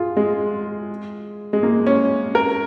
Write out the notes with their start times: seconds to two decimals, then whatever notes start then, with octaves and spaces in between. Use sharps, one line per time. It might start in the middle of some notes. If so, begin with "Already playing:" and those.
Already playing: F4 G#4
0.17 G#3
1.53 G#3
1.63 A#3
1.86 C#4
2.35 A#4